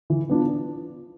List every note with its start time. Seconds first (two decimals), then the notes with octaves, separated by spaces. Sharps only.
0.10 E3
0.29 B3 D4 F4